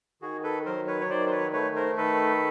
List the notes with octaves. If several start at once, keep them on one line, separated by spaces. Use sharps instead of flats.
D#3 F#4 G#4
A4 B4
F#3 A#4 C5
B4 C#5
C#5
D#3 C5 D5
C5
B4 C#5
A3 B4 C#5
A#4 C5
D#3 A4 B4